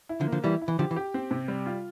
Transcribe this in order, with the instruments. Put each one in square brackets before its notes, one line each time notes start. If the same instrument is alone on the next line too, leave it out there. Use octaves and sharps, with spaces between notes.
[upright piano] E4
[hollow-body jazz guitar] D3 F3
[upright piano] A#3
[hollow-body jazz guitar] D3 F3
[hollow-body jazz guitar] E3 G3 [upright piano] E4
[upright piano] E4
[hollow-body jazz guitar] E3
[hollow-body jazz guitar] D3 F3 [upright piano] G4
[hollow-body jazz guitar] E3
[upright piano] G4
C4
C3
G3
F4